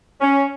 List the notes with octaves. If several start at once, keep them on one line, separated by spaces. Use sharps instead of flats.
C#4